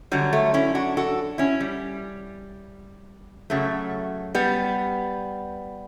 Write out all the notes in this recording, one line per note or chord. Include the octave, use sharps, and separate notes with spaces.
F#2 D3 F#3 G3
A3
C#4 E4
D4 F#4
F#4 A4
C#4 E4
G3
F#2 C#3 F#3 A3
G3 B3